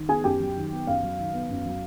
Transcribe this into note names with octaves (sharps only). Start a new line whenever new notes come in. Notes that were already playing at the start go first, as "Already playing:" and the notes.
Already playing: D#3
B3 G#4 G#5
F#2 G4 G5
F#3
D#3
B3
F#2 F5
F#3
D#3
B3
F#2
F#3